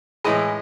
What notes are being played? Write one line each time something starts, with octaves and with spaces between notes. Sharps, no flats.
A2 E3 G#3 D#5